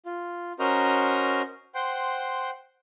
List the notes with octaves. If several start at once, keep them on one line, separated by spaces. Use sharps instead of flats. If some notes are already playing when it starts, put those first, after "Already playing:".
F4
C#4 F#4 A#4 C5 D#5 A#5
C5 F#5 G5 C6